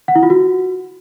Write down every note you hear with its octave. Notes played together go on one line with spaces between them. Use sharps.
F#5
E4
F4
F#4